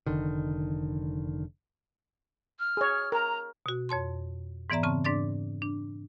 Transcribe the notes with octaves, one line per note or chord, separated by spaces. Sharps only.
F1 D3 D#3
F6
G#4 C#5
A#4 A#5
B2 F#4
F2 C#5 A5 C6
G#2 E3 B3 D5 E5 A#5
C#3 C4 A5 C#6
G#2 D4 D5 D6 A6
D4